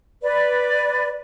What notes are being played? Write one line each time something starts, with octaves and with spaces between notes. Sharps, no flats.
B4 D5